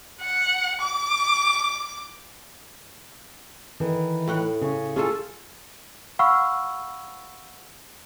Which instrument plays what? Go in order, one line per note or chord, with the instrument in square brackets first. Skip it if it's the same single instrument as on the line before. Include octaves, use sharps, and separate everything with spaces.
[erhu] F#5
D6
[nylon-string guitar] D#3 E3 A4
[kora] A2 F#5 G5
[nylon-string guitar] C#3
[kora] C#4 F4 A4 [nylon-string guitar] G#4
[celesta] F5 F#5 B5 C#6 E6 F6